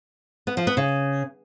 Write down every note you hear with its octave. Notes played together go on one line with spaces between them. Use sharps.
B3
F3
B3
C#3